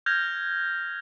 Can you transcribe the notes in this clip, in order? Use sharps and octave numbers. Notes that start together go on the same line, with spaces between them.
F6 G6 G#6 A#6 F7